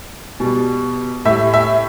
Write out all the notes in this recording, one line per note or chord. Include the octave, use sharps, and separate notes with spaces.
B2 G3
A2 G3 E5
E5